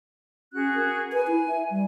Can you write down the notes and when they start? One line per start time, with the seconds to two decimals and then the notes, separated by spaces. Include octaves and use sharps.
0.53 C#4 F#4 G#4 F#6
0.75 A#4
1.12 B4 G#5
1.27 E4
1.48 E5
1.71 G3